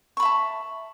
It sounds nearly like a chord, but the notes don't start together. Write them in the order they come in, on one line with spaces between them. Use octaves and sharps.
C#6 B5 E5 A5